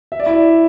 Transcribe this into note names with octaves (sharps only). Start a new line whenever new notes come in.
E5
D5
E4 E5